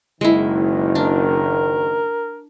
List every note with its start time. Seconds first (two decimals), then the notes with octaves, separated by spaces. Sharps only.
0.21 F#1 D#3 G#3 E4
0.95 D4 A#4